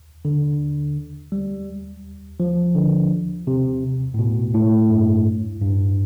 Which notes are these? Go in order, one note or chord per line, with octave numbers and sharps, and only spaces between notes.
D3
G3
F3
D3
C3
A2
B2
A2
G2
G2